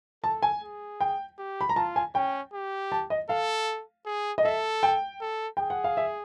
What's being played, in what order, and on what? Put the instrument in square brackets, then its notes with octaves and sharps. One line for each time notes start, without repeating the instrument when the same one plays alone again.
[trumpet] A4 [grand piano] A5
[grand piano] G#5
[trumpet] G#4
[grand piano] G5
[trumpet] G4
[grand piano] B5
A#5
[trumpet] F4 [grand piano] A5
[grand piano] G#5
[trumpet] C#4 [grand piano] G5
[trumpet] G4
[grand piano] A5
D#5
[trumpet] A4 [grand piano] F5
[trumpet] G#4
[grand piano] D#5
[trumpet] A4 [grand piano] E5
[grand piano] G5
[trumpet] A4
[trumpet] G#4 [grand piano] G5
[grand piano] F#5
F5
E5